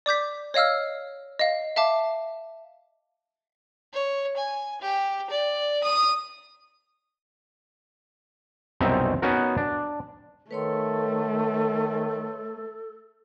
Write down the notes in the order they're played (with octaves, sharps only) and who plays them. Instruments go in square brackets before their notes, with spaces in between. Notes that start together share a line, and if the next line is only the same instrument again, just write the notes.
[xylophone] D5 D6 G6 B6
C#5 D#5 F5 E6 F6
D#5 F5
E5 F5 A5 D6
[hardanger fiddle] C#5
G#5
G4
D5
D#6
[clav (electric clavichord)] C2 F#2 B2 C4 D#4 E5
B3 C#4 D#4 F#4 A#4
D4
[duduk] D#3 [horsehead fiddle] A3 [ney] A4 [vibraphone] B4 C#5 C6